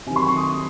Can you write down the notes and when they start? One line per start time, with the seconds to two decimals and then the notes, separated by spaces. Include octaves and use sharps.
0.06 C3 D#3 F#3 G#5
0.16 C6
0.26 C#6
0.37 D#6